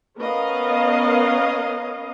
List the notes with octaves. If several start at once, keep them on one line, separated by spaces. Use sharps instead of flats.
B3 C#4 A#4 D#5 F5